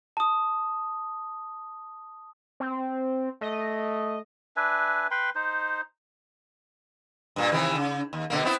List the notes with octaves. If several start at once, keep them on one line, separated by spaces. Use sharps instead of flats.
A5 D#6
C4
A3 D#5
D4 B4 E5 G#5
B4 G5 B5 C6
D#4 C5
G2 A#2
C3 D#3 E3
C#3
D#2
B2 D3 A#3
B3 C4 E4